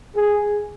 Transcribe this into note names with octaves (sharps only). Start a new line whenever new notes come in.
G#4